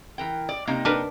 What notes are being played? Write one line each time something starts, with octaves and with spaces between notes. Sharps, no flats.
E3 A#4 G5
D5
C3 A#3 D#4
D4 A#4 B4